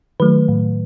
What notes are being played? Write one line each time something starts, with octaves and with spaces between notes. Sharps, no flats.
D#3 F#3 A3 B4
A2